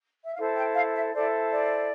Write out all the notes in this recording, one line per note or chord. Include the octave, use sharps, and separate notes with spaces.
E5
E4 A4 C5 F5
G5
F5
E5
E4 A4 C5 D5
D5